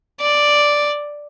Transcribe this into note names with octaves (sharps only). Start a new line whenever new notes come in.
D5